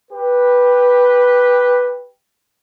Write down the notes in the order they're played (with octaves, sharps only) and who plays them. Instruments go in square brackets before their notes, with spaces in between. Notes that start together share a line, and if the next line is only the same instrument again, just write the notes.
[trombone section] G4 B4